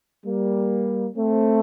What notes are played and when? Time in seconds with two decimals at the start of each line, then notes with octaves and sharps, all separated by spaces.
0.25 G3 A#3
1.17 A3 C4